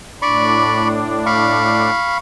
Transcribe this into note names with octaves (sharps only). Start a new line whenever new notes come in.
A2 D4 D5 B5 C#6
F5 B5 C#6